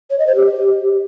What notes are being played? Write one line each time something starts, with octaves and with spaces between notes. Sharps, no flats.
C#5
D#5
C5
G4